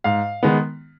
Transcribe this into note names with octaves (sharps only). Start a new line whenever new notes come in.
G#2 F5
D#3 G#3 B3